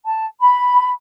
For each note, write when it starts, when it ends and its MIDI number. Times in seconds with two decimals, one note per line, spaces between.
0.05 0.26 81
0.40 0.91 83